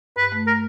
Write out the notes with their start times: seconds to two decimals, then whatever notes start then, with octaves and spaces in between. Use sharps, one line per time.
0.16 G2 B4
0.32 A3
0.47 A#4